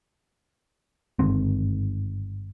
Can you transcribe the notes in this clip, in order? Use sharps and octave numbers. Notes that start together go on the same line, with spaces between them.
G1 G#2 D#3 C4